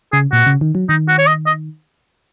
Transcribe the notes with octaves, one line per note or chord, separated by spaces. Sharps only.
C#3 G#4
A#2 F#4
C#3
D#3
F#3
D#3 D#4
F#4
C#5
D#5
D#5